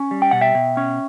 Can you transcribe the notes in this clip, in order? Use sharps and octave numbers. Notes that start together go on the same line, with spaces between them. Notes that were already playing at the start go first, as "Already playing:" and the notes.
Already playing: C#4
G3
G5
B2 F#5
E5 G5
B2
C#4